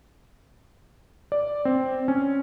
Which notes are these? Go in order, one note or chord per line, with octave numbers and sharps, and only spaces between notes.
D5
C4
C#4